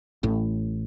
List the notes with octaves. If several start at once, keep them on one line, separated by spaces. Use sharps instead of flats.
A1 A2